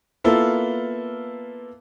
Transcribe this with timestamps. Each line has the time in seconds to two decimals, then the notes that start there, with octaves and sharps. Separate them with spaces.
0.24 A#3 B3 E4 F4 A4